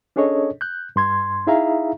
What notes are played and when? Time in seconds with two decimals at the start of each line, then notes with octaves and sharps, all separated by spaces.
0.16 C#4 D4 G#4 A4 C#5 D#5
0.61 F#6 G6
0.96 G2 C6 G#6
1.47 D#4 E4 G#4 E5 F5 A#5